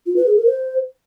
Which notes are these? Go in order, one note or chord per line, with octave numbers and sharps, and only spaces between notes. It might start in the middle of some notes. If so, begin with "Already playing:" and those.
F4
B4
G#4
A#4
C5